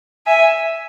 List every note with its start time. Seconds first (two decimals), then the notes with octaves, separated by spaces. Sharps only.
0.26 E5 G#5